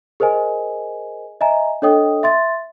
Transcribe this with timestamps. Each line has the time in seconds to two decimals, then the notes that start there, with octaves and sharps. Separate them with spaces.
0.20 G#4 A#4 C5 D#5 G#5
1.41 D#5 E5 G#5 A#5
1.82 D4 A4 C#5 D#5 G5 D#6
2.23 E5 C6 A6